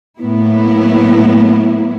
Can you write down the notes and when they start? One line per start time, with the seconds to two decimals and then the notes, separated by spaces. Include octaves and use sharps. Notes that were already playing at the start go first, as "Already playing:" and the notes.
0.19 A2 F#3 A#3 B3 E4